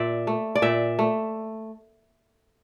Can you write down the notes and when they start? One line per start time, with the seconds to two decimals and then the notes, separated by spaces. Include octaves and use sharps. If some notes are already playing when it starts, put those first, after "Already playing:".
Already playing: A#2 D5 E5
0.27 A3
0.55 D5
0.62 A#2 E5
0.99 A3